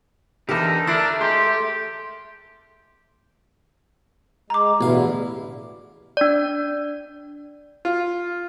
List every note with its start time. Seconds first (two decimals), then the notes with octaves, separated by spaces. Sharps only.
0.49 E2 D3 D#4 G4 A#4 A5
0.87 A3 D4 E4 A#4
1.21 G#3 G4 C6
4.50 G#3 A#5 D6
4.81 A1 E2 B2 D3 E4 F5
6.17 D4 D5
7.85 F4